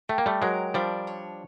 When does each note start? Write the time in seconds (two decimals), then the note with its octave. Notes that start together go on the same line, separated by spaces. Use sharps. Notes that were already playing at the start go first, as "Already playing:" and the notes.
0.09 A3 G4
0.18 A#3
0.26 G3 A3
0.42 F#3 G#3 A#4
0.74 F3 G3 D4
1.07 C#5